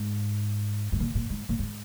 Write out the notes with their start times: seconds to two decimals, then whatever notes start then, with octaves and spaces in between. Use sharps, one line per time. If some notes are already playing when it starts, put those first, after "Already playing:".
Already playing: G#2
0.92 G#2
1.00 A#2
1.15 A#2
1.30 G#2
1.49 A#2
1.59 G#2